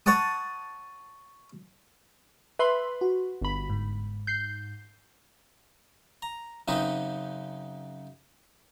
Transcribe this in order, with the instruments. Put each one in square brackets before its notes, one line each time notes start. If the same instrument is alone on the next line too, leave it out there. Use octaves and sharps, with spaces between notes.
[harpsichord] C#5 F#5 A5 D#6
[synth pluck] B4 B5 C6 [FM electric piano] E5
[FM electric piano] F#4
[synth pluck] G1 B5
[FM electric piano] G#2
[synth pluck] G6 C7
[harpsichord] A#5
F#2 C#3 C4 D#4 B4 D#5